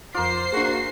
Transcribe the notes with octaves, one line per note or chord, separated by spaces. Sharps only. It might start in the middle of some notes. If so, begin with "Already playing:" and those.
F2 F4 A#4 C5 D6 C7
A#3 D4 F#4 G#4